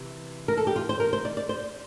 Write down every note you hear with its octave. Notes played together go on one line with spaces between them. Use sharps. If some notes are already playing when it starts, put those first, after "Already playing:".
Already playing: C3 E3
A#4
A4
G4
F4
C5
A#4
C5
D5
D5
C5